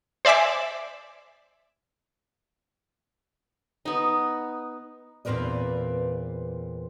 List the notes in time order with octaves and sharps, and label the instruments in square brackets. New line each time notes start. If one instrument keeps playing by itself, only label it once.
[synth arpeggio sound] C5 D5 E5 G#5 D6
[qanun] B3 D#4
[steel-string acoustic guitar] E2 A#2 C4 A#4 B4 D5